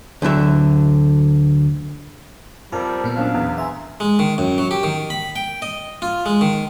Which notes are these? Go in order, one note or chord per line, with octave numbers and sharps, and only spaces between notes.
D2 D3 F#3 E5
F2 G3 F4 A#4
A#2 B3
F#3 C#4 D4 F5
E2
E5 G#5 A#5 C6
G#3
D#3
F#2
F#3
G4
D#3
B5
G5
D#5
F4
G#3
D#3